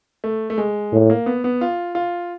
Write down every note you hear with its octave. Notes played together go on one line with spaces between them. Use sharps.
A3
A3
G#3
A2
A#3
B3
B3
F4
F4